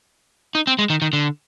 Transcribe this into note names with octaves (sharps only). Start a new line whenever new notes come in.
D#4
C4
G#3
D#3
D#3
D3